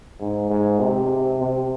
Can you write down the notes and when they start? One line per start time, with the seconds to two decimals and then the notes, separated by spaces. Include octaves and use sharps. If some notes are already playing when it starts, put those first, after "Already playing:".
0.20 G#2
0.50 G#2
0.80 C3
1.40 C3